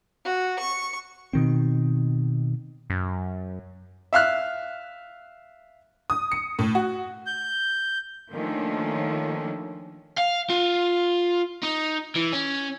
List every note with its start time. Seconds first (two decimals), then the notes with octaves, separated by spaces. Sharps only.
0.25 F#4
0.59 C#6
1.33 B2 D#3 C4
2.90 F#2
4.13 E5 F5 F6 F#6
6.10 D#6
6.32 C#7
6.59 A2
6.75 F#4
7.26 G6
8.33 D#3 F3 A3 A#3 C#4 D4
10.18 F5
10.50 F4
11.63 D#4
12.15 E3
12.32 C#4